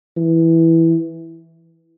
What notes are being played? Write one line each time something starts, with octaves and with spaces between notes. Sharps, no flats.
E3